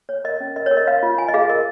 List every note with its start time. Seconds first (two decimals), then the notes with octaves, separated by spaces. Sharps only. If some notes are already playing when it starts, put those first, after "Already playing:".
0.09 C#5
0.24 A#4 D#5
0.40 C#4
0.56 A#4 D#5
0.66 C#5
0.71 A#4
0.77 D#5
0.87 C#5 F5
1.03 F4
1.18 F4 G#5
1.28 D#5
1.34 G#4 F5
1.49 A#4 D#5